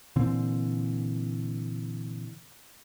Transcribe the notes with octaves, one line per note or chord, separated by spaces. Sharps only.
A#2 D3 E3 C4